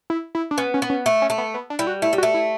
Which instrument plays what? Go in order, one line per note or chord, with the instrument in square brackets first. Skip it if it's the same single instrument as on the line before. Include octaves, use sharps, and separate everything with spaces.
[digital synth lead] E4
E4
D4
[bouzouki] B3 [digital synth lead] C#4
[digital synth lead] C#4
[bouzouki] B3
[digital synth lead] C#4
[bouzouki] A3
[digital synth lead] C#4
[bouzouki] A3
[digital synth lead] B3
B3
D4
[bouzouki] G3 [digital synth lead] E4
[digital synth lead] F#4
[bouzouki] A3 [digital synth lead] E4
[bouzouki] G3
[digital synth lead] F#4
[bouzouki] A3
[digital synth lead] E4